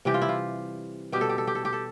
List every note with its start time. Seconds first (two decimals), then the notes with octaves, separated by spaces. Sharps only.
0.05 C3 E3 G3 G4
0.14 F4
0.22 E4
0.29 F4
1.12 B2 G3 G4
1.21 A4
1.29 G4
1.38 A4
1.47 G4
1.55 A4
1.65 G4
1.73 A4